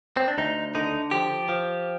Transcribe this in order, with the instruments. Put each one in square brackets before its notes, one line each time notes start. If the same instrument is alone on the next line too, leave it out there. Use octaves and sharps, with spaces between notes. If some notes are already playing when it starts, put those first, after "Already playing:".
[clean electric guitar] C4
D4
D2 D#4
D3 D#4
F3 G4
F3